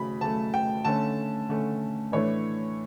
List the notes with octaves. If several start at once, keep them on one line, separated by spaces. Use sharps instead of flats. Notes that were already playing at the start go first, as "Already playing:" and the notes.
Already playing: C#3 F#3 A3 B5
C#3 F#3 A3 A5
G5
D3 A3 C#4 A5
D3 A3 C#4
A2 E3 A3 D4 C#5